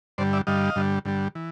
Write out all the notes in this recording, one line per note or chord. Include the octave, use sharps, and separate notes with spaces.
G2 D3 G3 C5 D5
D5 E5
G2 D3 G3 D#5 F5
G2 D3 G3
G2 D3 G3
E3